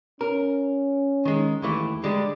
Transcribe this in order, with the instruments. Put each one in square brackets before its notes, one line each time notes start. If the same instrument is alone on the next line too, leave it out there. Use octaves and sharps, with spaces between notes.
[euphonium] C#4 [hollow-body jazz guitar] A#4
[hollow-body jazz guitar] D#3 G#3
D#2 E3 A3
D3 G3 G#3